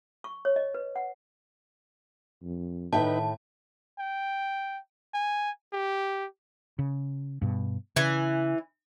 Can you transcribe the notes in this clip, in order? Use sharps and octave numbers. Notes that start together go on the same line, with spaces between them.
C#6
C#5
D#5
B4
F#5
F2
A2 D#3 D#4 B4 E5 G5 A5
G5
G#5
G4
C#3
G2 B2
C#3 E3 G#5